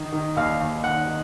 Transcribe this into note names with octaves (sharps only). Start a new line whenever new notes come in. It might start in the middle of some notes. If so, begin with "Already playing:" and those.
Already playing: D#3
D#3
D#2 F5
D#2
D#3 F#5
D#3